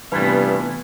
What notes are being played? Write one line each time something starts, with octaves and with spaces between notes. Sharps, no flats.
G2 C3 E3 A3 B3 F4 B4